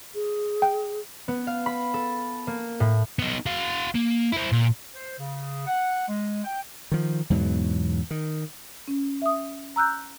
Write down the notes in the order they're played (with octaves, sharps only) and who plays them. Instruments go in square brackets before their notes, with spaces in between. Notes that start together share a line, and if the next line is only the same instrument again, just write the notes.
[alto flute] G#4
[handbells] G5
[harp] B3
F5
B5
A4
A#3
A2
[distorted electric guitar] B3 D#4
F#4 F5
A#3
E4 C5
A#2
[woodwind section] C5
C#3
F#5
G#3
G5
[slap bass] D#3 F3
E2 G#2 B2 F#3
D#3
[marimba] C#4
E5 D#6
A#5 E6 F#6 G6